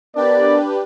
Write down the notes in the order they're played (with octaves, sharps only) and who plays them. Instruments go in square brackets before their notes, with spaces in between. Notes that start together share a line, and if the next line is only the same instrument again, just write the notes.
[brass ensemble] B3 A#4 D5 [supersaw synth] D4 G4 B4